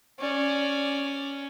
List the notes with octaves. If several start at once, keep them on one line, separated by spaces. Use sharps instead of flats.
C#4 D5